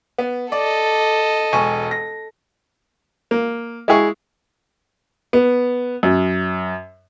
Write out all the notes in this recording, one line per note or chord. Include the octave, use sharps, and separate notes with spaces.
B3
A4 D5 D#5
E1 G#5 C#6
A#6
A#3
G#3 E4 G#4 C#6
B3
F#2